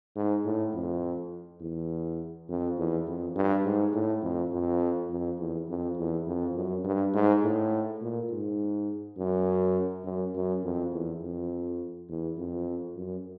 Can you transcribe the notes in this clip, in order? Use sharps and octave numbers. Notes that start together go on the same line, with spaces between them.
G#2
A2
F2
E2
F2
E2
F2
G2
G#2
A2
F2
F2
F2
E2
F2
E2
F2
F#2
G2
G#2
A2
A#2
G#2
F#2
F#2
F#2
F2
E2
F2
E2
F2
F#2